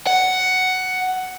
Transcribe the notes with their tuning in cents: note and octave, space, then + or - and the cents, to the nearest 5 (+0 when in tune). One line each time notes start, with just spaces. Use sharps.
F#5 +5